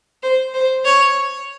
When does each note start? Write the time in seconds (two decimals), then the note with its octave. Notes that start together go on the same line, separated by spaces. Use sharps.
0.23 C5
0.54 C5
0.85 C#5